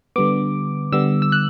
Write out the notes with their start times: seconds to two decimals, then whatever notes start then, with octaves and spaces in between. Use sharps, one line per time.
0.16 D3 G3 B3 D6
0.92 D3 G3 B3 E6
1.22 E6
1.32 F#6